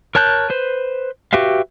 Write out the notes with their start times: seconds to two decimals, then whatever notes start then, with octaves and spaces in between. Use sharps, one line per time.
0.15 A#4 C#5 A5 F#6 G6
0.50 B4 C5
1.33 F#4 G4 B4 E5 F5